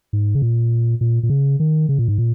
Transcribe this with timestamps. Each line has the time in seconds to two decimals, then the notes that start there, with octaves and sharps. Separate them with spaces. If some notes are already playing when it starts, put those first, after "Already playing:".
0.13 G#2
0.35 C#3
0.42 A#2
1.01 A#2
1.23 A#2
1.30 C#3
1.60 D#3
1.89 C#3
1.99 A#2
2.08 G#2
2.18 A#2